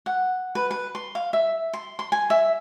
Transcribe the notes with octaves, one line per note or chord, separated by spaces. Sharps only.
F#5
B4
B4
C6
F5
E5
C6
C6
G#5
E5